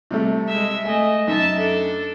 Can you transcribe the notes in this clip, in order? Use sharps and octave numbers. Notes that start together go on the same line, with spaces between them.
C3 G3 A3
G#3 E5
A3 D#5 G#5
F#2 D#4 E5 A5
D4 A4